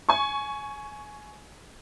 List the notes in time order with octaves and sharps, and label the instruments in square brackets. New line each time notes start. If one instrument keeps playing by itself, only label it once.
[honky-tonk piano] G#5 C#6